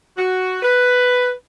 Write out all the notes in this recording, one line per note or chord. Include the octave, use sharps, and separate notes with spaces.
F#4
B4